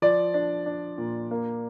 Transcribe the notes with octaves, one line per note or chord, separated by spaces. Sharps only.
F3 D5
D4
D4
A#2
A#3